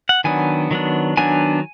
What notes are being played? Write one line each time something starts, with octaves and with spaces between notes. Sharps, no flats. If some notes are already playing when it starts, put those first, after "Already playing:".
F#5
D#3 F#3 B3 D4 G#5
D#3 F#3 B3 D4
D#3 F#3 B3 D4 G#5